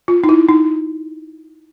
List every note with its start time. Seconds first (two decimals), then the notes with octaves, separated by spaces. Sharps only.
0.08 F4
0.24 D#4
0.29 E4
0.49 D#4